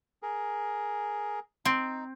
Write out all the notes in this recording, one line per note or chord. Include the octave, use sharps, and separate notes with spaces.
G#4 A#4
C4 D#4